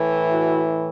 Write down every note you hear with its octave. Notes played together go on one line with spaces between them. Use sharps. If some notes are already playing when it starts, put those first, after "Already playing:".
Already playing: A2 E3
E4 F#4